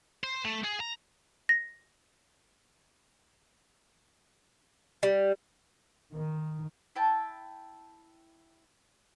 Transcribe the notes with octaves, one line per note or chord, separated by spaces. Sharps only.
C5
A3
G#4
A#5
A#6
G3
D#3
E4 G5 A5